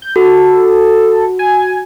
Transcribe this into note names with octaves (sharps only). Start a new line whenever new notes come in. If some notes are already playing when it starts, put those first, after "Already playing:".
G6
F#4 A4
G#5